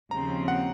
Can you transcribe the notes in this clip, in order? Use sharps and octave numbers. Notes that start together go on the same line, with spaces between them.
D#2 C#3 F3 C4 A#5
F#5